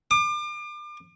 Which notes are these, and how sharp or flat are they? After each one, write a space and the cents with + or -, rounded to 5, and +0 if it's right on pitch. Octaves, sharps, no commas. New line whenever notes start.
D6 +35